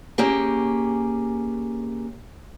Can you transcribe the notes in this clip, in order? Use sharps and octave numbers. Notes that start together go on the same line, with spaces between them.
A#3 C#4 G4 G#4